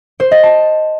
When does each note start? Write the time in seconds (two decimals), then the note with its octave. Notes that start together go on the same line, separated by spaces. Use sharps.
0.20 C5
0.31 D#5
0.43 A5